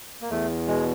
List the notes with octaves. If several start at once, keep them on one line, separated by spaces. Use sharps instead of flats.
A#3
E2 A3
B2 G#3